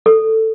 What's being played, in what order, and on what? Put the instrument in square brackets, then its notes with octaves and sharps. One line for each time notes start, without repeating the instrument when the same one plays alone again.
[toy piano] A4